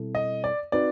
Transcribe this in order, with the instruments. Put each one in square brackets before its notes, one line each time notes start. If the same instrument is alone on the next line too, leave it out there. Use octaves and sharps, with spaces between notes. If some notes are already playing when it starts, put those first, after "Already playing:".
Already playing: [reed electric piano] B2 G3 C4 E4 A4
[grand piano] D#5
D5
[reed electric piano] C4 D#4 F#4 B4 [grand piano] D5